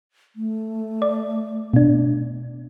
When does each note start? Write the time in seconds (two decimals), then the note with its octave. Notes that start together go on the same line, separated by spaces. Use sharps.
0.36 A3
1.02 D5
1.73 B2 D4